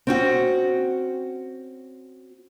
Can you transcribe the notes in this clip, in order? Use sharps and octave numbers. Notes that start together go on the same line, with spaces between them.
C4 C#4 F#4